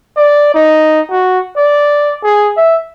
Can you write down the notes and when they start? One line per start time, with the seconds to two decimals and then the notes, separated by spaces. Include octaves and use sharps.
0.17 D5
0.55 D#4
1.11 F#4
1.57 D5
2.24 G#4
2.57 E5